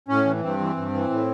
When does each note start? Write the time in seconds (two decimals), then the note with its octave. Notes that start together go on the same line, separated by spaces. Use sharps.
0.08 A2 C#4
0.25 E3
0.42 G2 C4
0.59 E3
0.76 G2
0.94 E3
1.10 A2